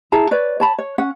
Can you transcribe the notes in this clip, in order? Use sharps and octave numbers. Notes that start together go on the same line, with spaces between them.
E4 G#4 A5 A#5
B4 C#5 D5
C#5 A5 B5
C#5
C#4 F#5